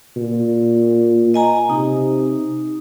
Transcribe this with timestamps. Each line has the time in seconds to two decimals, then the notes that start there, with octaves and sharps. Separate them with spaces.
0.17 A#2
1.34 D#5 G#5 A#5
1.70 C3 D#4